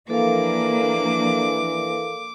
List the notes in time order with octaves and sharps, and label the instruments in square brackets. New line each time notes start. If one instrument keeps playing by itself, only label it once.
[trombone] E3 [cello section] F3 A#3 D4 [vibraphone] A4 A#4 F5 [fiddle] D6